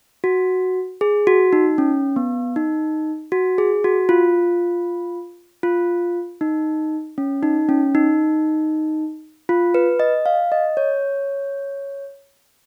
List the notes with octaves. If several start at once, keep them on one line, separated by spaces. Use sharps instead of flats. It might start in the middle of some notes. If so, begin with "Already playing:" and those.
F#4
G#4
F#4
D#4
C#4
B3
D#4
F#4
G#4
F#4
F4
F4
D#4
C#4
D#4
C#4
D#4
F4
B4
D#5
F5
D#5
C#5